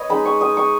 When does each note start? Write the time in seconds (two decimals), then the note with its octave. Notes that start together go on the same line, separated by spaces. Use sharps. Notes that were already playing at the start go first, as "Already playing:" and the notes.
Already playing: B4 C#5 D#5
0.09 G#3 D#4 B5
0.25 C#6
0.41 D#6
0.57 C#6